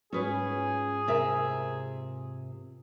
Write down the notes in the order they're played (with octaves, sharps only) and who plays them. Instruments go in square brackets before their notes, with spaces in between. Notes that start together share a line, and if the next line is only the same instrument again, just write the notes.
[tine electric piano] G#2 F4 [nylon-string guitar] C#4 B4 C#5 [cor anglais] G#4
[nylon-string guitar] C3 A#4 E5